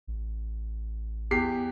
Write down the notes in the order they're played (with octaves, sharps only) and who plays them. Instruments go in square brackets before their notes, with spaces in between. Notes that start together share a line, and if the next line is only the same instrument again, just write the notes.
[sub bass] A1
[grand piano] E2 G4 C7